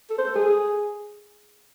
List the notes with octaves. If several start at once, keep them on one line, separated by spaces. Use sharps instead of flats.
A4
C5
A4
G#4